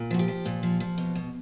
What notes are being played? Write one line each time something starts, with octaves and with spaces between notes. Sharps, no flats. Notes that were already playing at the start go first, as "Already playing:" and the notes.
Already playing: A#2
F3 F#4
G4
F3
A#2
F3
F3
B2
B2